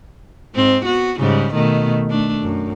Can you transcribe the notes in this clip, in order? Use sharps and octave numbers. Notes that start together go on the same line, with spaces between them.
G#2 C4
B3 F#4
G#2 C#3 G3
B2 D#3 A3
A3 D4
F#2